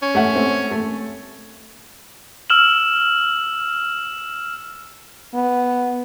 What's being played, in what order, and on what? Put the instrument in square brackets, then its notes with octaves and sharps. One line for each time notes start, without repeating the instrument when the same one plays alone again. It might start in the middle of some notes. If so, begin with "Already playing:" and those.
[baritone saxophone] C#4
[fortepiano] A3 E5 F#5
A3 C4
A3
[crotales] E6 F6 E7 F#7
[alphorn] B3